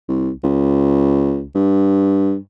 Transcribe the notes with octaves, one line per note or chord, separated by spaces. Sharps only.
C2
C#2
G2